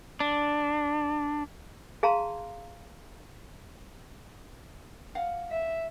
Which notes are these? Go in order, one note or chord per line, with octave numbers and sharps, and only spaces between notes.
D4
G#4 F5 A5 A#5 C6
F5 F#5
E5